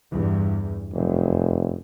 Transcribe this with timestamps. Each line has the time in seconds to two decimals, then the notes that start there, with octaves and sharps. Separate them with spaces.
0.12 E2 G2
0.94 F1 F#2